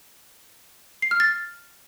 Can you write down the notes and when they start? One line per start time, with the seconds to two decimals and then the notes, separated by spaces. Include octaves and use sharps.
1.02 C7
1.11 F6
1.20 A6